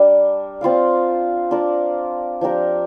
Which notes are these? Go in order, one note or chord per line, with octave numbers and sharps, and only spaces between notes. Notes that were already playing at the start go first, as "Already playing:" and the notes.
Already playing: G3 D4 A#4
C4 F4 D5 F5
D4 F4 A#4
F3 D4 G4 A#4